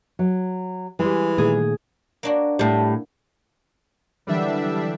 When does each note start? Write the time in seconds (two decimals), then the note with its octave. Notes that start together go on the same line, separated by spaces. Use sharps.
0.19 F#3
0.99 E3 G3 G#3
1.38 A#2 D#3 A3 G#4
2.23 A#3 D4 F#4
2.59 A2 G3
4.27 D3 E3 F#3 G3 D4 E5